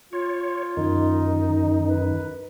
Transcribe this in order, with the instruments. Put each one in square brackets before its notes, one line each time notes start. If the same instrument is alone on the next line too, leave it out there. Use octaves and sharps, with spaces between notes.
[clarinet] F4 [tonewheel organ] C#5
[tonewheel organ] F#2 D#3 [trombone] D#4
[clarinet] B4